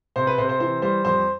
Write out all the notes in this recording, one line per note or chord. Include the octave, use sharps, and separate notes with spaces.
C3 C5
B4
C3 C5
C5
E3 C5
G3 C5
F2 C5